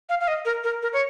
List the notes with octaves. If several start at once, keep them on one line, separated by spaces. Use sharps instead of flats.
F5
F5
D#5
A#4
A#4
A#4
C#5